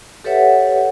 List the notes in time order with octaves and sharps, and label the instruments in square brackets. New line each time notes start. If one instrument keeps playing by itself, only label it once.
[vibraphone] G4 A4 B4 C#5 E5 F#5